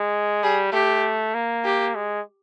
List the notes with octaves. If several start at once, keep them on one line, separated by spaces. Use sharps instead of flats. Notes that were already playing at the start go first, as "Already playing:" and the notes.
Already playing: G#3
G3 G#4
A3 G4
A#3
G4
G#3